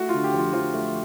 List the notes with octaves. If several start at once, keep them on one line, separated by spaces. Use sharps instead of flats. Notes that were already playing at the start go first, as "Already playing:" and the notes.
Already playing: A3 F#4
D3 F4
G4
F2 F4
F3 F4
A3